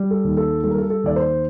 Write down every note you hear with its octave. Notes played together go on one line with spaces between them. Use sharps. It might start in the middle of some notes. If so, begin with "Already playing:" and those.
Already playing: G3
A4
D#2
A4
G3 A4
A#4
A4
A4
D#2 D5
C5